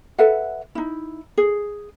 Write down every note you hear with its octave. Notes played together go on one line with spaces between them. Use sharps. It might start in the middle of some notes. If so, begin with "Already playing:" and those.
A4 B4 E5 F#5
D#4 E4
G#4